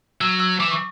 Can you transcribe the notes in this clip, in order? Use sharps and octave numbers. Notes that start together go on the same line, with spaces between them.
F#3 E6
E6
E3 D6
C#6